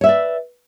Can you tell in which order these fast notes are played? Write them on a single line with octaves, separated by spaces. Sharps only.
C#5 E5 B4 D5